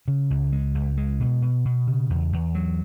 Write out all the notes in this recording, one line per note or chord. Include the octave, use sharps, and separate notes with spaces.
C#3
C#2
G#3
C#2
G#3
B2
B2
B2
C#3
E2
E2
F#3